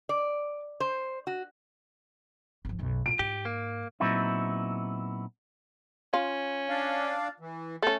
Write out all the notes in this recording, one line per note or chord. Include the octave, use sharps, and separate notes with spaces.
D5
C5
F#4
G#1 F3
B1 F#2
A#2 D7
G#2 G4
A#3
A#2 F#3 B3 C4 D#4 E4
C#4 F4
D4 D5 F5
E3
A3 C#4 A4